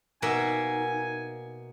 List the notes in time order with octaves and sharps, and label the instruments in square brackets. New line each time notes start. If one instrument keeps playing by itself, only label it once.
[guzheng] B2 A#3 E5 [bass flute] D#4 [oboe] G#5